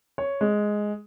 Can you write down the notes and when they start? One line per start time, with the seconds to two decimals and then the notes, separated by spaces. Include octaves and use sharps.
0.18 C#5
0.41 G#3